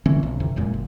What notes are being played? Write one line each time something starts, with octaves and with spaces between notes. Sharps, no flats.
D3 E3 C4 C#4
B1
F1 F2 C3 E3
E1 F#2 A#2 G#3
F#1